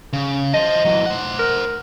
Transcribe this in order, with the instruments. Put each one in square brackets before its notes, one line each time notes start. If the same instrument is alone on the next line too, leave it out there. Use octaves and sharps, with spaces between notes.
[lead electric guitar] C#3
[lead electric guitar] C5 A5 [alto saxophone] D#5
[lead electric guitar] E3 F#3
C5 F#5
[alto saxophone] A#4